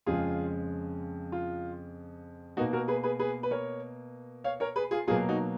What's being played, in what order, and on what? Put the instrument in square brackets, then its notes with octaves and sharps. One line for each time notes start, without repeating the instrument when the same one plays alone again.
[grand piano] F2 C#3 G#3 F4 G#4
F4
B2 A#3 D#4 F#4
F#4 A#4
G#4 B4
G#4 B4
G#4 B4
B4
A#4 C#5
C#5 F5
A#4 C#5
G#4 B4
F4 G#4
B2 F#3 A#3 F4 G#4
D#4 F#4